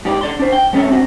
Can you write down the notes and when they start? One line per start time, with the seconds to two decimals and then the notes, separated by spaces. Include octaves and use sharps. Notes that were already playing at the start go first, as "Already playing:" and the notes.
0.05 G#2 G4 D5
0.21 D3 D5 C6
0.39 D4 C5
0.52 G5
0.73 G#3 B3 C#4 A4 C#5 E5
0.89 C4 D4 F#4